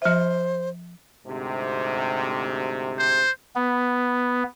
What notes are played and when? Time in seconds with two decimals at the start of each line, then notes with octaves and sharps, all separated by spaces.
0.02 F3 C5 E5
1.26 D2 G#2 C3
2.98 C5
3.56 B3